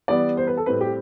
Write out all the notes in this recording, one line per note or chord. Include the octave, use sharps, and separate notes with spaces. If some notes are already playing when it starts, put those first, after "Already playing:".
E3 G3 B3 D5
C5
B4
A4
A2 G3 C4 B4
G4